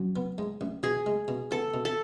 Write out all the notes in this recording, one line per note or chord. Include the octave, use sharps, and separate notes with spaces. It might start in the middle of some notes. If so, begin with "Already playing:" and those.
Already playing: F#2
B3
G#2
A1
B2 G#4
G#3
B2
B3 A4
B2
A4